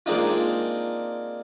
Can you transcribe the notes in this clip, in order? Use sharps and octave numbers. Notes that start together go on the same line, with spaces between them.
G#3 A#3 C4 D4 D#4 F4